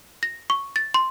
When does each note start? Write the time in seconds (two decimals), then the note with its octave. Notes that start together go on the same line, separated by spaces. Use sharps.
0.23 A#6
0.50 C#6
0.76 A6
0.94 C6